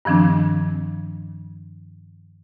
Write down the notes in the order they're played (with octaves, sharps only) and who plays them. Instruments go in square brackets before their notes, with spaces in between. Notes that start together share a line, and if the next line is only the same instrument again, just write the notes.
[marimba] G2 D#3 F3 C4 D4